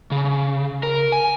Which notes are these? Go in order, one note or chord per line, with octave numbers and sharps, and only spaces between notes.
C#3
A#4
G#5